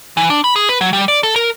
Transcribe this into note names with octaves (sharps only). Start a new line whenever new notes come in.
E3
D4
B5
G#4
B4
F#3
G3
D5
A4
A#4